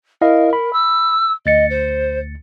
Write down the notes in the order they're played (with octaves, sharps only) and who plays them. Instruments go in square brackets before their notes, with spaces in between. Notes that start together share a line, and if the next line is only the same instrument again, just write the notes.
[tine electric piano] E4 D#5 F5 [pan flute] A#4
[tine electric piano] B5
[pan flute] E6
[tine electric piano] D2 A6 C#7 [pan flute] D#5
[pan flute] C5